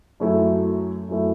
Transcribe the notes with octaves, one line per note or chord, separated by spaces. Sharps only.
F#2 F#3 A3 E4
F#2 F#3 A3 E4